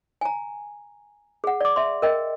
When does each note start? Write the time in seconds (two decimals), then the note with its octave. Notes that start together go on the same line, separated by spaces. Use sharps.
0.21 G#5 A#5
1.44 G#4 F#5
1.61 D5 D6
1.76 E5 C6
2.02 A#4 D#5 G5